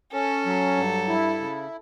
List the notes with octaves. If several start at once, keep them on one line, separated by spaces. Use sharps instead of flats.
C#4 A4
F#3
G2
E4
C#3